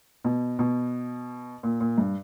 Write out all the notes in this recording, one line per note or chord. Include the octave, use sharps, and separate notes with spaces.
B2
B2
A#2
A#2
G2